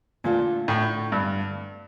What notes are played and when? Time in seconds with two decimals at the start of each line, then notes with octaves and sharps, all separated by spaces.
0.24 A#2 D3 A3 D4 F4 A4
0.68 A2
1.12 G2